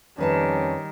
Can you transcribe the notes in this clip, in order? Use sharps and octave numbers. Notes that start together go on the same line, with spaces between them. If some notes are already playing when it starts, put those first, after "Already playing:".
F2 D#3 G3 C#4 B4 A5